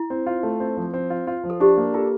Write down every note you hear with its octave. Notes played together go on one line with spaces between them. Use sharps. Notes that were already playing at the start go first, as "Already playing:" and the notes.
Already playing: E4
C4
F4
A3
C4
F3
C4
F4
F4
F3
A4
D4 G4
A#3
F4 A4